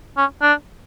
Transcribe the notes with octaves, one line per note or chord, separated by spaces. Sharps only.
C#4
D4